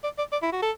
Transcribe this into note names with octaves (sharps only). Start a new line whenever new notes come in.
D5
D5
D5
E4
F#4
A4